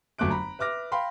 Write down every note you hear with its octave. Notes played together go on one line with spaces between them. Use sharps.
G1 F#2 A3 D6 F#6 D7
A#5 B5
B4 E5 D6 F6 A#6
F5 G5 B5 C6